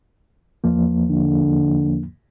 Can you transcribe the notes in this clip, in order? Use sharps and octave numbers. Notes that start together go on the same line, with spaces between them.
E2 F3 A#3
D3